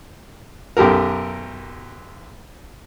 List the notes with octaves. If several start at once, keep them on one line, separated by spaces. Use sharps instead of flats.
B1 F#2 G4 A4 A#4